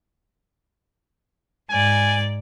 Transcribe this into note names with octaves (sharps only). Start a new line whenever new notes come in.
G#2 D5 G#5